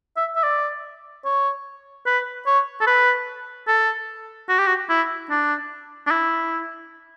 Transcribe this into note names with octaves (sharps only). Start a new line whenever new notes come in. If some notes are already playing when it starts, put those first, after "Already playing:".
E5
E5
D5
C#5
B4
C#5
A4
B4
A4
F#4
G4
F#4
E4
D4
D4
E4